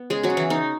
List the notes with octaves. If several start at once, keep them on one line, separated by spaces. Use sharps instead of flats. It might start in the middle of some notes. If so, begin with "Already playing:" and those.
Already playing: B3
C#3 G#3 G#4
F#3 F#4
C#3
E3 E4
C#3 D#4